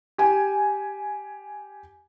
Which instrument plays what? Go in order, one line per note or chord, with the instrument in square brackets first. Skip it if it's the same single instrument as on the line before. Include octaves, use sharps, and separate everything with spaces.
[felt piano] G4 G#5